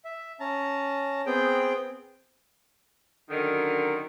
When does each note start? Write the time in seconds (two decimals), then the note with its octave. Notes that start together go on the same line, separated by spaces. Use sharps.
0.05 E5
0.40 C#4 A5 A#5
1.26 B3 C4 G#4 G5
3.30 F#2 D3 D#3